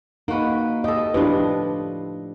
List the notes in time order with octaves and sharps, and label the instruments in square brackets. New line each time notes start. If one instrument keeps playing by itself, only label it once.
[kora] A#3 F#4 B4 [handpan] D#4
[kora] G4 A4 [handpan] D#5
[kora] A2 F3 [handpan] D4 G4 B4